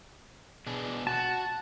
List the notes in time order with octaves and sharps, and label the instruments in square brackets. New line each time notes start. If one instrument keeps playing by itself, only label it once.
[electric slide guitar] B2 D4 G#4
[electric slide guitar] F#4 [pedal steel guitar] A5